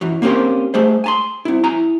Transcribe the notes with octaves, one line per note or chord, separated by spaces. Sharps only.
F#2 E3 F#3
A#3 C4 C#4 G4 A#4 C5
G#3 A3 G#4 C5
G#5 A5 C6
C4 E4
E4 G#5 A#5